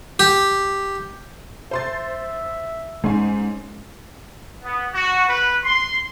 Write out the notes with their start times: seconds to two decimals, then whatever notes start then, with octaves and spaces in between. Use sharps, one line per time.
0.19 G4
1.71 C5 E5 C6 A6
3.04 G#2 G#3 C#4 G#5
4.63 B3
4.93 F#4
5.28 B4
5.64 C6